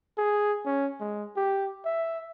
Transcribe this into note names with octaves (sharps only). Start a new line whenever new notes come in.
G#4
C#4
G#3
G4
E5